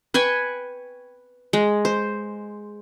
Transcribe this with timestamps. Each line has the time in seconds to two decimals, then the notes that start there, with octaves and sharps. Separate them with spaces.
0.14 B4 G5 G#5 C#6
1.53 G#3
1.85 C5